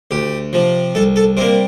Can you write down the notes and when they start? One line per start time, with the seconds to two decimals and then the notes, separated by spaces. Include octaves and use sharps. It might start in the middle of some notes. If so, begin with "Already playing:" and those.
0.11 D2 G4
0.53 C3 F3
0.95 C2 A4
1.16 A4
1.37 C3 G3 A#3 C4